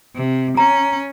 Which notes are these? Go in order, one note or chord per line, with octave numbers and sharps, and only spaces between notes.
C3
C#4 A#5